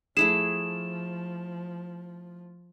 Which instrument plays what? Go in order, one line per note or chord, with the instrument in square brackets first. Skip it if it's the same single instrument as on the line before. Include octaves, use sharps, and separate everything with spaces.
[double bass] F3 [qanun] A3 E4 G#4 [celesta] E7